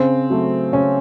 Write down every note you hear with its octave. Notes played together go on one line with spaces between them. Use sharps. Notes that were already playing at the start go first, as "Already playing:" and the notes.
Already playing: C#3 C4
F#3 A3
C#3 C#4